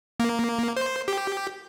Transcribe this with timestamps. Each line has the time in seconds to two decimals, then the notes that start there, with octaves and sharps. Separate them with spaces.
0.20 A#3
0.77 C5
1.08 G4